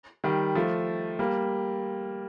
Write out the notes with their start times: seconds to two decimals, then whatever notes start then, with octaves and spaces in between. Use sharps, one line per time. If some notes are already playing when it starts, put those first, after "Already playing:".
0.24 D#3 G3
0.55 F3 A3
1.19 G3 A#3